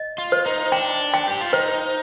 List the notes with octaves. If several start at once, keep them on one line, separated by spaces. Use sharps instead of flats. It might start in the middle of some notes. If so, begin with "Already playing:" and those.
Already playing: D#5
F4
C5
D#4
D4 G5
G5
G4
F4
D#4 C5